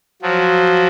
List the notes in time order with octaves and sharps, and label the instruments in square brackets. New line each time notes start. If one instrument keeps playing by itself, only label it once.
[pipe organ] F3 F#3